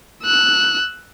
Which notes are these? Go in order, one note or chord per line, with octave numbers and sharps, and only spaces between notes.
E6 F#6